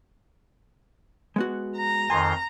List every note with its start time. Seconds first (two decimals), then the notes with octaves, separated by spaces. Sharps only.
1.36 G#3 B3 F#4
1.77 A#5
2.10 F2 D#3 G#5 C6